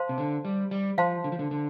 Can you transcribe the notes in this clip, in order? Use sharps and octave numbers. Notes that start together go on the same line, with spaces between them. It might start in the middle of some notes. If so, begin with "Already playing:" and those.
Already playing: C5 F5 A5 C6
C3
D3
G3
G3
F3 C5 F5 A5 C6
D3
F3
D3
D3